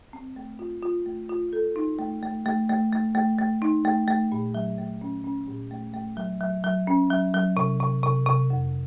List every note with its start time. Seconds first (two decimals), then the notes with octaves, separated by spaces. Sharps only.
0.13 C4
0.36 A3
0.59 F4
0.83 F4
1.06 A3
1.29 F4
1.53 A4
1.76 D#4
1.99 A3
2.23 A3
2.46 A3
2.69 A3
2.92 A3
3.15 A3
3.39 A3
3.62 D#4
3.85 A3
4.08 A3
4.32 A#2
4.55 F#3
4.78 A3
5.01 C#4
5.24 C#4
5.47 A#2
5.71 A3
5.94 A3
6.17 F#3
6.41 F#3
6.64 F#3
6.87 C#4
7.10 F#3
7.34 F#3
7.57 C3
7.80 C3
8.03 C3
8.26 C3
8.50 F2